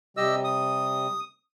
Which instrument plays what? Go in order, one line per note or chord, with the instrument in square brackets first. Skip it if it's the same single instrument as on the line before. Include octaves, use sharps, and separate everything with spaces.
[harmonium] C3 G3 [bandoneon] G4 D#5 E6
[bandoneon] D#6